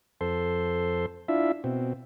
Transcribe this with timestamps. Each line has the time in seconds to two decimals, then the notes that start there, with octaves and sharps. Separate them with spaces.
0.21 F2 A4 C5 C6
1.28 D4 E4 F4 E5
1.64 B2 C4